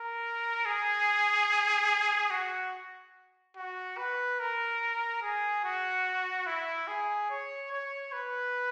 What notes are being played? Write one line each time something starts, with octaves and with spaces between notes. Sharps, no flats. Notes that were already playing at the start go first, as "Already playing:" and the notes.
Already playing: A#4
G#4
F#4
F#4
B4
A#4
G#4
F#4
E4
G#4
C#5
C#5
B4